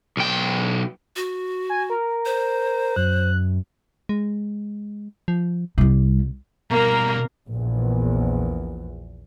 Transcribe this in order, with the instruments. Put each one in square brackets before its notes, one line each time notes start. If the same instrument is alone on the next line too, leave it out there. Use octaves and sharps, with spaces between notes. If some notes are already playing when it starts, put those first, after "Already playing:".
[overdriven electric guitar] B1 G5
[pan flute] F#4
[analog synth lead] G#5
A#4
[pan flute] C5
[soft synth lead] F#2 [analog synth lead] F#6
[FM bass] G#3
F3
[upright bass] C2 G3 [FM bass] C3
[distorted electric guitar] B2 G3 [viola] A#3 A#4 [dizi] A#5
[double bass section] A#1 E2